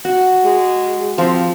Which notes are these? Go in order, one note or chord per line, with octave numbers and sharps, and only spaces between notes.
F#4
G#3
F3 C4